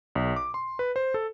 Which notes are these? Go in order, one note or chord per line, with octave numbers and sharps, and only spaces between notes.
B1
D6
C6
B4
C5
A4